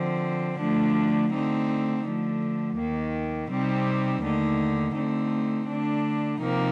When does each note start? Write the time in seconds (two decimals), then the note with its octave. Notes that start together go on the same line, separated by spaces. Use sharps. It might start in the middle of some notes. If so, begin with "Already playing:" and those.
Already playing: D3 F3 C4
0.59 D3 F3 A3 D4
1.32 D3 A3 C4 D#4
2.04 D3 F3 A3
2.77 D#2 D#3 A#3
3.50 C3 G3 C4 D#4
4.23 D#2 D3 A3 D#4
4.95 D3 A3 C4 D#4
5.68 D3 A3 D4
6.40 C3 F3 A#3 D#4